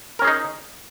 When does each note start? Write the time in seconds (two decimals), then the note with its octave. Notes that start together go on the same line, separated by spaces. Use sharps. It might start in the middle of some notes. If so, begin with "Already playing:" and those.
0.19 A#4
0.22 C#4
0.25 G#4
0.27 D#4